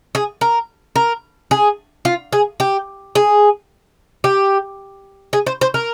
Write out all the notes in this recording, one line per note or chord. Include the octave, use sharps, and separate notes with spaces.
G#4
A#4
A#4
G#4
F4
G#4
G4
G#4
G4
G#4
C5
C5
A#4